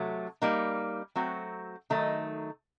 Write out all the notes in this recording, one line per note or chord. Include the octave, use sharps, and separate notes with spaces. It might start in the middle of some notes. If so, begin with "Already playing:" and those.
Already playing: C3 F#3 A3
G3 A#3 D#4
F#3 A3 C4 F#4
D#3 F#3 A3 D#4